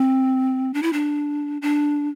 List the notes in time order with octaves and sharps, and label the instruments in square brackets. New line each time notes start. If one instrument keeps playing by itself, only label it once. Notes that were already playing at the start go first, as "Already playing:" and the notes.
Already playing: [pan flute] C4
D4
E4
D4
D4